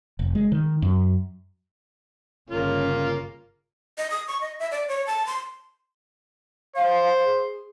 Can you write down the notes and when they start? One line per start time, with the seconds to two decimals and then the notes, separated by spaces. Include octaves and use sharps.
0.19 F1
0.35 G#3
0.52 D#3
0.82 F#2
2.50 G1 C#3 A#3 C#4 F4
3.98 D#5
4.10 D#6
4.28 C#6
4.41 D#5
4.59 E5
4.71 D5
4.89 C#5
5.07 A5
5.27 C6
6.76 C5 F5
7.24 G#4